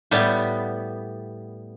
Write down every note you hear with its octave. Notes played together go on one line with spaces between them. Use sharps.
A2 G3 B3